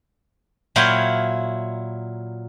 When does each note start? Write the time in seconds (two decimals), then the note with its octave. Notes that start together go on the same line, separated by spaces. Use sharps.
0.76 A#2 F#3 E4 F5 G5 G#5